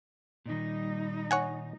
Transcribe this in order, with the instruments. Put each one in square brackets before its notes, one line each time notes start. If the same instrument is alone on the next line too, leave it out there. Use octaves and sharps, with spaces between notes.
[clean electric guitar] A#2 D#3 [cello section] G3 D#4
[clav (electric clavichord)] C#5 F#5 G#5